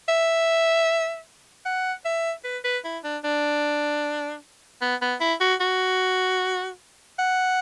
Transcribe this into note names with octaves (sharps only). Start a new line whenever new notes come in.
E5
F#5
E5
B4
B4
E4
D4
D4
B3
B3
E4
F#4
F#4
F#5